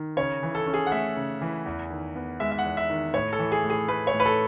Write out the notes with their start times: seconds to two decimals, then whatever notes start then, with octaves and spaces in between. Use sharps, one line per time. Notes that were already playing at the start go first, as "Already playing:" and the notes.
Already playing: D#3
0.17 C#3 C#5
0.43 E3
0.55 A4
0.67 C#4
0.74 G#4
0.86 F#5
0.92 A3 E5
1.17 C#3
1.41 E3
1.66 E2
1.90 D#3
2.16 B3
2.40 G#3 E5
2.51 E5
2.58 F#5
2.65 E2
2.77 E5
2.90 D#3
3.14 A2 C#5
3.33 A4
3.39 E3
3.52 G#4
3.64 A2
3.70 G#4
3.88 A3 B4
4.07 C#5
4.13 A2
4.20 B4
4.26 A4